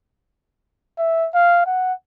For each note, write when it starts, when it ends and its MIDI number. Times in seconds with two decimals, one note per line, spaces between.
0.99 1.28 76
1.34 1.64 77
1.67 1.93 78